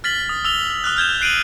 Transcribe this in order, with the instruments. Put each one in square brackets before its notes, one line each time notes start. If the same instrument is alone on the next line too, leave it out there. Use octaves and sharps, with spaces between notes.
[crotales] F6 A6 B6 F#7
D#6
E6 F7 G7
D#6 F6 F#6
F6 G6 G#6 E7
F#6 C7 D7 D#7 F7 F#7